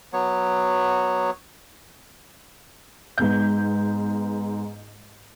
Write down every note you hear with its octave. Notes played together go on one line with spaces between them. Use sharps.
F#3 B3 C#5
G#2 B3 G6